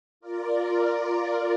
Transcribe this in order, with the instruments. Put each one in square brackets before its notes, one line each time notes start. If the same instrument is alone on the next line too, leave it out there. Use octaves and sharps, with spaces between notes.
[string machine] F4 A#4 D5